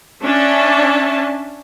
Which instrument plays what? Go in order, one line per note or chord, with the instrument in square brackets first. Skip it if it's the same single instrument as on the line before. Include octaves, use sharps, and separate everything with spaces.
[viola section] C#4 D4 E5 A5